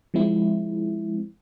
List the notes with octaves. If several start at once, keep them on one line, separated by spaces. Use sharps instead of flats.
F3 G#3 C4 E4